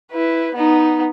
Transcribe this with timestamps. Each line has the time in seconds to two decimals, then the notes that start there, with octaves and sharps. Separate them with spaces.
0.12 E4 B4
0.55 B3 D#4